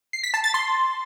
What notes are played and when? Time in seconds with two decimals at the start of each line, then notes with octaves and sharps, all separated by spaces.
0.13 C7
0.23 B6
0.34 A5
0.44 A6
0.54 C6